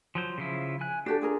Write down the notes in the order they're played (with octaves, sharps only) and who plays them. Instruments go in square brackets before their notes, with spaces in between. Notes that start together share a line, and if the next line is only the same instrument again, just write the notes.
[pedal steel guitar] F3 F#3 C5
C#3 F3 E4
G#5 F#6
[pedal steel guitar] D4 [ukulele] F#4 G4 A4
[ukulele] F4 G#4 A#4